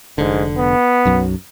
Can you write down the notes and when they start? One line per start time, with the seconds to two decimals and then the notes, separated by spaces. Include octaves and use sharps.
0.18 F1 G#2 D3
0.58 B3
1.05 B1 F#2 F#3